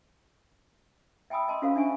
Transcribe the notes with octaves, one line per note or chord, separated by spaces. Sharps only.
E5 G5 G#5 B5 D#6 E6
D#5 A5 A#5 C6
C#4 F4 F#4 A4 C5 F5
D4 E5 G#5 C#6